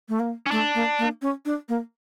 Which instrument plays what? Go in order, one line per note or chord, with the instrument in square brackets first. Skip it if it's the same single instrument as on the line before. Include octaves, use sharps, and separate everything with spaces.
[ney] A3
A#3
[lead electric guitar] C#4
[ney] A3 [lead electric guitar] D4
[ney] A#3
A#3
C#4
D4
A#3